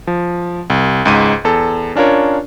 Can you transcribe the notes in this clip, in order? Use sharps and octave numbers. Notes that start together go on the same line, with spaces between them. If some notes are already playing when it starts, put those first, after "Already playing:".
F3
C2
C#2 G#2 D#7
E2 A4
C#4 D4 F4 A#4 C#5